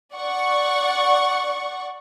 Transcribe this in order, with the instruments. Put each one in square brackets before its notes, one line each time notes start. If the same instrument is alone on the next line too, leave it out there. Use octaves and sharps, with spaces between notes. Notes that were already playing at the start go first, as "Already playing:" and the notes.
[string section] D5 F#5 C#6